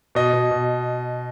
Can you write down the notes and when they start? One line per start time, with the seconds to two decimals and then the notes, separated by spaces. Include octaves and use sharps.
0.15 B2 D#5
0.33 B2
0.51 B2